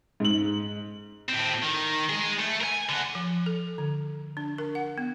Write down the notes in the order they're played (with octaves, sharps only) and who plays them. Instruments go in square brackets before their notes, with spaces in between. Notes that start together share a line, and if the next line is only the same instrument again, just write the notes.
[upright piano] G#2 F#7
[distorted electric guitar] A2 C4
D#3
G#3 G#4
A3
A#4 G#5
D3 F#4
[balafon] F3
A4
D3
D4
A#4
F#5
B3